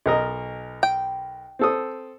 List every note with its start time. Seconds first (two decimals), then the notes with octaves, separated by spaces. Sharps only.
0.06 B1 A#4 D#5
0.83 G5
1.59 C4 A4 D#6